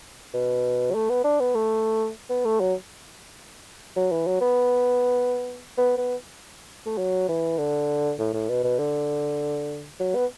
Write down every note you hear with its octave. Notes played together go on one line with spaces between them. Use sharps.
B2
F#3
A3
B3
D4
B3
A3
B3
A3
F#3
F#3
E3
F#3
B3
B3
B3
A3
F#3
E3
D3
A2
A2
B2
B2
D3
F#3
B3